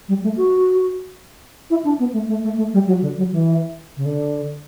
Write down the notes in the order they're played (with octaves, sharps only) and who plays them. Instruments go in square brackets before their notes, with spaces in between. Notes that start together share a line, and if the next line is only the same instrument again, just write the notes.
[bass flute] G3
A3
F#4
E4
D4
B3
A3
A3
A3
A3
G3
F#3
D3
F#3
E3
C#3
D3